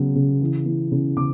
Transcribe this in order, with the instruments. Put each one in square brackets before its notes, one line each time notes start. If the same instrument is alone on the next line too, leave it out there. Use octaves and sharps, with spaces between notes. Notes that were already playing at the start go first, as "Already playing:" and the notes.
Already playing: [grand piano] C#3 F#3 B3
C#3
E3
E3
C#3
C#3 D6